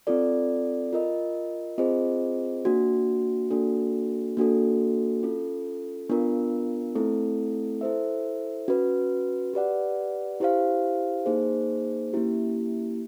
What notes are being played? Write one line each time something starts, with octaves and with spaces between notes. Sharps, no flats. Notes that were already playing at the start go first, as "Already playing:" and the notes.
C4 F4 A4 D5
F4 A#4 D#5
C4 F4 G#4 C5 D#5
A#3 D4 F#4
A#3 D4 F#4 A4
A#3 D4 F#4 A4
C#4 F4 A4
B3 D4 F4 A#4
A3 C4 E4 A4
E4 A4 C5 E5
C#4 F#4 B4
G4 B4 D5 F#5
E4 G4 C5 F5
A#3 D#4 G#4 C5
A#3 C#4 E4 G4